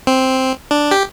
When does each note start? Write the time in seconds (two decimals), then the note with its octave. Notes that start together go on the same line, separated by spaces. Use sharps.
0.07 C4
0.71 D4
0.91 G4